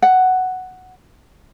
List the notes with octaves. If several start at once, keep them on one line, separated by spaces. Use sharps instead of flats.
F#5